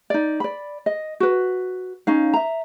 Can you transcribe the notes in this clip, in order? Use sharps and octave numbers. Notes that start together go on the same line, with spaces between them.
D#4 D5
D5 B5
D#5
F#4 B4
C#4 D#4 F5
E5 A#5